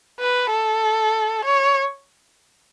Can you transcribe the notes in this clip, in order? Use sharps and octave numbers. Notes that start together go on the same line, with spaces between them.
B4
A4
C#5